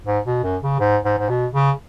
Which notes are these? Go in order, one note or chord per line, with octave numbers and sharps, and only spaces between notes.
G#2
B2
F#2
C#3
G#2
G#2
G#2
B2
C#3